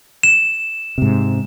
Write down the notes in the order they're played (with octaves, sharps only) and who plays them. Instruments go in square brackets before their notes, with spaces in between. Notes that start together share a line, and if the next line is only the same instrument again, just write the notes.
[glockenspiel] E7
[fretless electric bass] G#2 C3